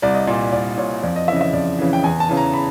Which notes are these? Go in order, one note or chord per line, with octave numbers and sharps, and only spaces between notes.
C2 D5
D#5
A#2 D5
C2 D5
A#2 C#5
F2 D5
D#5
C#3 E3 D#5 E5
E5
F2 D5
C#3 E3
G5
E2 G#5
A5
C#3 E3
A#5
B5